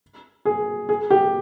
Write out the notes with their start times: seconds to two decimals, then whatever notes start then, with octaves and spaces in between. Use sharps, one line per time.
0.45 G#4
0.89 G#4
1.10 G4